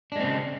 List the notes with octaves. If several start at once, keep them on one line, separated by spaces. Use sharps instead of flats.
C#3 G#3 C4 D4